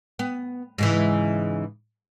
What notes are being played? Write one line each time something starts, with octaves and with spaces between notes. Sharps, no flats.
B3
G#2 C#3 E3